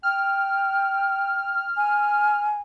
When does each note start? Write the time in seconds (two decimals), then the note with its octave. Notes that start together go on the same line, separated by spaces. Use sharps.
0.03 G5 F6
1.77 G#5